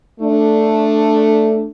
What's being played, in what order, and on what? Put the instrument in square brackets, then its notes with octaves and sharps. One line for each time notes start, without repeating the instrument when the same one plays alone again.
[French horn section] A3 D4